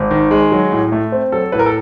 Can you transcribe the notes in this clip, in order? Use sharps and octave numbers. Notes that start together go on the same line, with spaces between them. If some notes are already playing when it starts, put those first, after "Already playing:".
Already playing: G#1
D#3
G#3
F#3
A2
A3
C4
F#3 A4
A2 B4
A#4
A4